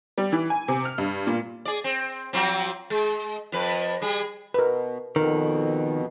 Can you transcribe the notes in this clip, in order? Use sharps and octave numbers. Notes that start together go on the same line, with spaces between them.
G3
E3
G#5
C3
F6
G2
A#2
G#4 D5
C4
F3 F#3 C4
G#3
F2 B4
G3 G#4
B2 A#4 B4
F2 B2 D#3 A#4